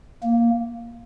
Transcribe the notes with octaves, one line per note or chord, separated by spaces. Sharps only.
A#3